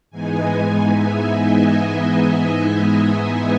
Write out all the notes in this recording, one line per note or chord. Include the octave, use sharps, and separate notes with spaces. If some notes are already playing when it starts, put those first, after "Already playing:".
G#2 E3 G#3 B3 D#4 G#5
E5
D#5